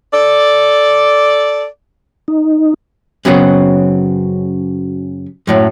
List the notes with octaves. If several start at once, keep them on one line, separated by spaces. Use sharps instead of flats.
A4 D5
D#4
F#2 C#3 F#3 B3 C4
F#2 A2 F#3